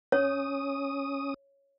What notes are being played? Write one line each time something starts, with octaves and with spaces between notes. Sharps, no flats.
C#4 C#5 D#6